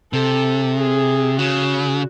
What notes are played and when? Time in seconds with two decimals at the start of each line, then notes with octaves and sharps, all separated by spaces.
0.12 C3 A4
0.76 G#4
1.39 C#3 F#4